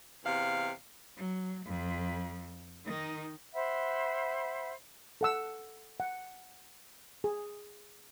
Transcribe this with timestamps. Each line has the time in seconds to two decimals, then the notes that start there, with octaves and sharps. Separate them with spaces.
0.24 E2 C3 F5
1.17 F#3
1.66 F2
2.86 D#3 D#4
3.53 C5 E5 F#5 B5
5.21 A4 F#5 E6
6.00 F#5
7.24 G#4